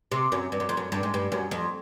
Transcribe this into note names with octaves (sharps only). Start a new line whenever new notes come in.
C3
F#2
G2
F#2
F2
F#2
G2
G#2
G2
F#2
F2